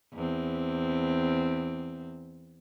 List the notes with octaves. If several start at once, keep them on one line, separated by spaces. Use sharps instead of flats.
E2 C4